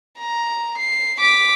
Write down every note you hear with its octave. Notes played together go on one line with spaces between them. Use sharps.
A#5
C7
D6 B6